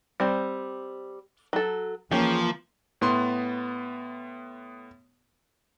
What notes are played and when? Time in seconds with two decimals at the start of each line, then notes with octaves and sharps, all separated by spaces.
0.20 G3 C4 C5
1.53 F#3 A4
2.11 E3 F3 A#3 C#4 G4 G#4
3.01 A2 B3 C6